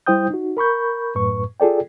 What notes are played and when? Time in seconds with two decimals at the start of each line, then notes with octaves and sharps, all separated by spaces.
0.06 G3 E4 C5 G5 D#6 G6
0.30 D#4 F#4
0.57 A#4 B5 C#6 G6
1.15 F#2 A2 B4 C#6
1.60 F4 G#4 A4 D5 G5